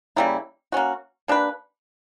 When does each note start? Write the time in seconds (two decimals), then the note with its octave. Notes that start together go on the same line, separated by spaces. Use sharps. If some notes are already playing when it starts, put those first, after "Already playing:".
0.16 C#3 G3 A#3 E4
0.72 A#3 C#4 F#4
1.28 A#3 D4 G4 B4